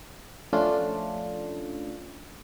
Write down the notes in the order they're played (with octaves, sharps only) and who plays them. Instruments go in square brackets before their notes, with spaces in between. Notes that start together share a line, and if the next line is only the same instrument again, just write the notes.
[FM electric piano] F3 A3 C#4 D4 F4